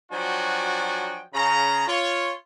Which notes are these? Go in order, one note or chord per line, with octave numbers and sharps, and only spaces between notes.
F3 F#3 D4 F#4 G5 G#5
C#3 A#5
F4 C#5